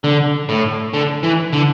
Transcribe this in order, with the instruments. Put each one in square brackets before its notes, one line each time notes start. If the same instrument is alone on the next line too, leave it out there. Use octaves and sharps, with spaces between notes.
[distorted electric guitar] D3
A2
D3
E3
D3